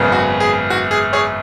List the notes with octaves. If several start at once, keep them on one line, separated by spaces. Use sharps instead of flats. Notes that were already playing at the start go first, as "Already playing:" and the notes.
Already playing: G#1 F#2 C#3 B3
F#4
G#4
F#4
G#4
G#4 C#5